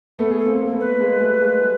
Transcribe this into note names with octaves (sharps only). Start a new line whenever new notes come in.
A3 B3 A4
G#4
A4
A#3 C4
A#3
A3 B3
B4
A3
G#3 A#3
G3 A3
G#3 A#3
G3 A3